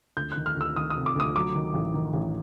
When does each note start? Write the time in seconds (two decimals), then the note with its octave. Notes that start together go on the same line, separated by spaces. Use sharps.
0.17 D2 G6
0.32 F#6
0.37 D#3
0.46 F6
0.56 D2 E6
0.76 D#3 D#6
0.90 D#6
0.96 C3
1.06 D6
1.16 D2 D#6
1.35 F#3 D6
1.55 D#3
1.74 A1
1.94 D#3
2.14 A1